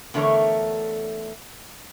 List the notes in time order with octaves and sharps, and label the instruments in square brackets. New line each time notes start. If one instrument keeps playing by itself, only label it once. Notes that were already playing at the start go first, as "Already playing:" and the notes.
[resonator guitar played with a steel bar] E2 D3 A3 A#4 C#5